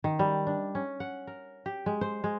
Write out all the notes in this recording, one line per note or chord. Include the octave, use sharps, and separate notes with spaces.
D#3
G3
D4
C#4
F#5
A#4
G4
G#3
C5
G#3